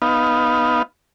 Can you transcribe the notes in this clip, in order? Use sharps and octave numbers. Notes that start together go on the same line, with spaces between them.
B3 D#4 F5